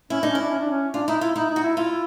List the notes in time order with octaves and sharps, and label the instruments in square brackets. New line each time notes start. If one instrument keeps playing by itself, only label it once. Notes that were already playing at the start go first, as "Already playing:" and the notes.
[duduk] C#4 [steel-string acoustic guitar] E4
[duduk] D4 [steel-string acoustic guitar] D#4
[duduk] C#4 [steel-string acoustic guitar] E4
[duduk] D4
C#4
D4
C#4
[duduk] D4 [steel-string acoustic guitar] F4
[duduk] D#4 [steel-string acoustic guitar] E4
[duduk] E4 [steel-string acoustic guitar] F4
[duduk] D#4 [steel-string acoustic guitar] E4
[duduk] D#4
[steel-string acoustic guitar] F#4
[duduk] E4
[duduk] E4 [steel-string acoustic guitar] F4